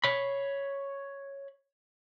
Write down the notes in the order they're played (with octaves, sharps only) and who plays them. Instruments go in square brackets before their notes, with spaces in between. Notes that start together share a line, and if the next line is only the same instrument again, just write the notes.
[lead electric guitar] C#5 B5